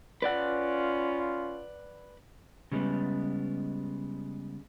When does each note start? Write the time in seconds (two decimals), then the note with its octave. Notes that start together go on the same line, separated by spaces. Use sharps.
0.22 C#4 F4 B4 D5 F#5
2.72 C#3 G3 G#3 B3